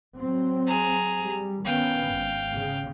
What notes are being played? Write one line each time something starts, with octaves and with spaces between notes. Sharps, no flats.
F#3 C4
G#4 A#5
G3
D#3 B3 C#4 F5 G5
G#1
C#3